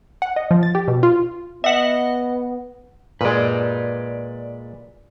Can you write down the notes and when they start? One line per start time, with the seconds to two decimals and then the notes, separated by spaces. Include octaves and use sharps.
0.22 F#5
0.36 D#5
0.51 F3
0.63 A6
0.75 G4
0.88 B2
1.03 F4
1.64 B3 D#5 E5 F#5
3.21 A#2 G#3 B4 D5